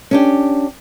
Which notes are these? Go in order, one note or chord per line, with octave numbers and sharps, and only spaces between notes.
C#4 D4 G4